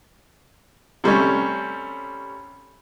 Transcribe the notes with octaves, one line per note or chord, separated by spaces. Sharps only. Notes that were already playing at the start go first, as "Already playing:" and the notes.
C3 G3 A3 C#4